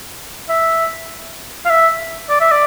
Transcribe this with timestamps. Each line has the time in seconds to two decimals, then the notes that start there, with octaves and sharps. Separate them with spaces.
0.49 E5
1.65 F5
1.70 E5
2.29 D5
2.41 E5
2.51 D5